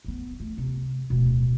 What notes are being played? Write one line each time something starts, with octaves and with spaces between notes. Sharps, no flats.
D1 B3
A3
C3
D1 B2